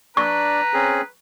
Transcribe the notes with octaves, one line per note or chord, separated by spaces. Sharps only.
D4 B4 D5 A#5 C#6
C4 C#4 G#4